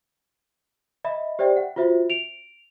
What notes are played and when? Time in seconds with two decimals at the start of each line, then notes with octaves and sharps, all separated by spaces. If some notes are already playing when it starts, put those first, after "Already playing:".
1.04 D#5 E5 B5
1.39 G4 C5 D5 E5 G5
1.57 F#5
1.76 F4 F#4 C5 E5
2.10 D7 F7